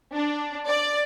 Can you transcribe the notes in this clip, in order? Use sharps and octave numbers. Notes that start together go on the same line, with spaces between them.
D4
D5